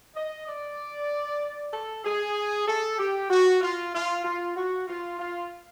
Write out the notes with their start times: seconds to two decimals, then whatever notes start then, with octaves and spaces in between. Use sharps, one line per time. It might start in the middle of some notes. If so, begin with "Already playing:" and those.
0.15 D#5
0.46 D5
1.73 A4
2.04 G#4
2.67 A4
2.98 G4
3.29 F#4
3.61 F4
3.93 F4
4.24 F4
4.56 F#4
4.87 F4
5.19 F4